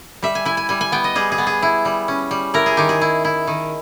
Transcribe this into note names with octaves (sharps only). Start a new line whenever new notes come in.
G3 E5
G#5
E4 G#5
G#5
G3 G#5
G#5
B3 G5
D#5
G3 G#4
G#4
B3
G#4
E4
G3
C#4
G3
E4 A#4
G#4
D#3 G4
G#4
E4
E4
D#3